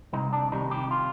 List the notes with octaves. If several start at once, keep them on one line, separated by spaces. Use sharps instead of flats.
C2 D#4
D4
C3 D#3 G3 D#4
G4
F4